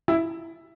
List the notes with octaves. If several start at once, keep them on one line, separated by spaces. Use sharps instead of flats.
E4